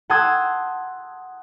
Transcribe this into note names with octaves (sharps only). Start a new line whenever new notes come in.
F#5 A5 C6 D#6 E6 G#6